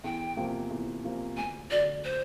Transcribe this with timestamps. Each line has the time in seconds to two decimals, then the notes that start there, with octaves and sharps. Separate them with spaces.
0.04 E2 G5
0.37 C3 F3 A#3
0.71 E2
1.04 C3 F3 A#3
1.37 D2 G#5
1.71 D3 F#3 A3 D5
2.04 C5